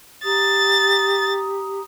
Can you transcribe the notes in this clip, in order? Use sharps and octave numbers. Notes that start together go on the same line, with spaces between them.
G4 A#5 D#6 A6